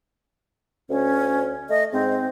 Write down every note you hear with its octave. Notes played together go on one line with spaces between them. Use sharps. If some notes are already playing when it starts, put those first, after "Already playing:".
D2 C#4
A3 D#5
G#2 C4